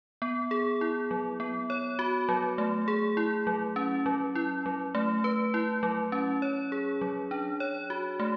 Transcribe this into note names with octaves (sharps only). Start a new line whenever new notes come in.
B3
G#4
E4
F#3
B3
C#5
F#4
F#3
A3
G#4
E4
F#3
C#4
F#3
E4
F#3
A3
B4
E4
F#3
C#4
C#5
G#4
F#3
D4
C#5
F#4
A3